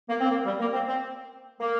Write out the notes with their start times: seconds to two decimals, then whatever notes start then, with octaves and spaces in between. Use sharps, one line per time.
0.09 A#3
0.21 C4
0.30 A#3
0.46 G3
0.60 A#3
0.73 C4
0.88 C4
1.60 A#3